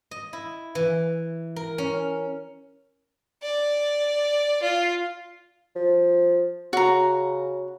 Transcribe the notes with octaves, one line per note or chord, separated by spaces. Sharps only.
D#5
E4
E3
A#4
C#4
D5
F4
F3
C#3 F#4 A#5